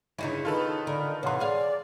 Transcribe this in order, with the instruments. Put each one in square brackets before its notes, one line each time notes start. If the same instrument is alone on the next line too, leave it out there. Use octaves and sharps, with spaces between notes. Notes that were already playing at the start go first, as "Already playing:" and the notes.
[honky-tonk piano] G1 [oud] C#3 D#4 E4
[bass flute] D#3 [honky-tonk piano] F4 A4 B4
[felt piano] D3 [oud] A#4
[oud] C3 E3 [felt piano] C#5 F#5 C6 [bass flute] F5
[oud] G#4 F5 [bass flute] D5